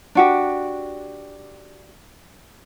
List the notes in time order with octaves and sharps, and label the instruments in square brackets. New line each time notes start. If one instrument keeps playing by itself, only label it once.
[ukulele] D4 F#4 G4